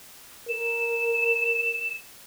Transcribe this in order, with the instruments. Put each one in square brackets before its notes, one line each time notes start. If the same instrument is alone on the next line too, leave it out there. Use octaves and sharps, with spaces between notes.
[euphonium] A#4 [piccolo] E7